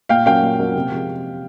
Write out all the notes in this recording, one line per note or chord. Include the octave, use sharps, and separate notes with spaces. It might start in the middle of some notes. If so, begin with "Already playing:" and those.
A#2 F5 G5
F#3 A#3 C#4 F5 G5
A#2
F#3 A#3 C#4
C3
F3 G#3